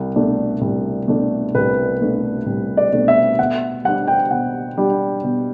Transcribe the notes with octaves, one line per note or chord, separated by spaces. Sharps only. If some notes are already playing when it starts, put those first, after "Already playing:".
Already playing: C2
B2 A3 D4
C2
B2 A3 D4
C2 B4
B2 A3 D4
C2
D5
B2 A3 D4
E5
B2 F#5
G3 D4 F#5
G5
B2 F#5
G3 D4
B2